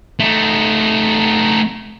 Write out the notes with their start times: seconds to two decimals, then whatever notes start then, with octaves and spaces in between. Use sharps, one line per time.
0.20 A3 D#4